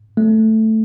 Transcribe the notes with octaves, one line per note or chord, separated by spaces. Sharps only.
A3